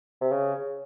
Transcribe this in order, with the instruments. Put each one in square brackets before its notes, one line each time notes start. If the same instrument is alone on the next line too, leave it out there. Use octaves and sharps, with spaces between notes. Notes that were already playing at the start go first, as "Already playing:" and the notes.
[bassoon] C3
C#3